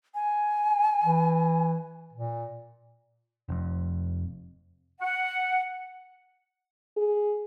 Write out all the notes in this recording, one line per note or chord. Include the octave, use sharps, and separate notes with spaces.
G#5
E3
A#2
F1 F2
F#5
G#4